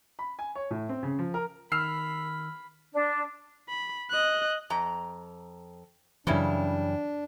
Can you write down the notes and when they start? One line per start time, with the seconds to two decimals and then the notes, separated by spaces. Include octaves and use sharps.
0.19 B5
0.39 G#5
0.55 C#5
0.71 A2
0.89 C4
1.03 C#3
1.19 F3
1.34 A#4
1.72 D#3 B5 E6 F6 C7
2.93 D4
3.69 B5
4.10 D#5 F#6
4.70 F2 A#5
6.27 F#2 C#3 E3 G3 D4 E4